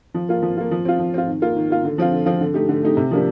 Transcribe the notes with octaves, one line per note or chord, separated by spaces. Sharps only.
F3
A#3 F4
F3
A#3 F4
F3
C4 F4
F3
C4 F4
D#3
A#3 F4
D#3
A#3 F4
D3
F3 C4 F4
D3
F3 C4 F4
D3
A3 D#4 G4
D3
A3 D#4 G4
C3
F3 A#3 D4 G4